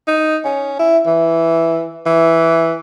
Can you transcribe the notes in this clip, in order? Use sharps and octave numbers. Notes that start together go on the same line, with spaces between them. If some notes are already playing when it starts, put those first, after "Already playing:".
D#4
C#4
E4
E3
E3